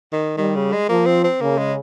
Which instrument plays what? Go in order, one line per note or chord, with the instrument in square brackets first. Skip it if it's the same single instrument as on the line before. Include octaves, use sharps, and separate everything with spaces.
[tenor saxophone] D#3
[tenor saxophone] D#3 [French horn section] G3
[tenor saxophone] C#3
G#3
[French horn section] F3 [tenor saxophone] A#3
[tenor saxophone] C4
C4
[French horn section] C#3 [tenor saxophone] A#3
[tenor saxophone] G#3